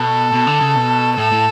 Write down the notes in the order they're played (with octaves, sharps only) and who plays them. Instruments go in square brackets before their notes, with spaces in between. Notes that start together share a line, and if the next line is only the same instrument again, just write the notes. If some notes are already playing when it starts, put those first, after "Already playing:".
Already playing: [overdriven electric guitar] B2 [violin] A4
[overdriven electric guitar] B2
D3
C#3
B2
[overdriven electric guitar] A2 [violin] A4
[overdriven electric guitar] A2